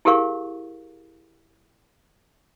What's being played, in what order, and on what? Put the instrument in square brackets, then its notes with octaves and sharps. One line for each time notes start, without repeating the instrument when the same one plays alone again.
[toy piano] E4 G4 G#4 A#4 F5 C#6